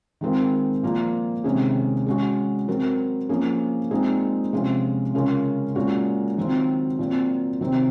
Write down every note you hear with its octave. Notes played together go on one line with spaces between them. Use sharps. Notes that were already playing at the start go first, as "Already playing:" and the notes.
D#3 G#3 C4 F4 A#4
A#2 F3 A#3 F4
C3 D#3 G#3 C#4 G#4
G#3 C#4 F#4
F#3 C4 F#4 A#4
F3 A#3 C#4 G#4
A#2 G#3 C4 D#4 G#4
C3 F3 G#3 C#4 F4
C#3 G#3 C#4 F4 A#4
A#2 G#3 C#4 F#4
D#3 F#3 C4 F4
A#2 F#3 C4
C3 D#3 F#3 C4